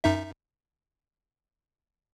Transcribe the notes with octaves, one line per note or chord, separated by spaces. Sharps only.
F#2 D#4 E5